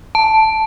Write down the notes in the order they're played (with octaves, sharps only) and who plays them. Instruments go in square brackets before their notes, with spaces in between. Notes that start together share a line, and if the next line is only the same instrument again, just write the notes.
[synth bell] A5